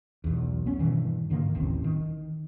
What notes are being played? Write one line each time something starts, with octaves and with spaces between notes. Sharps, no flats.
B1 E2
B3 C#4
G2 B2 D#3 E3
G#2 D3 D#3 A#3
D#1 A1 C4
D#3